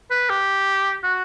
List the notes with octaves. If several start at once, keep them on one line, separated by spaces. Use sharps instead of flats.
B4
G4
F#4